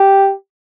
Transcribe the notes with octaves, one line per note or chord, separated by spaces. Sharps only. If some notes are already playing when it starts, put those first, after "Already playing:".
Already playing: G4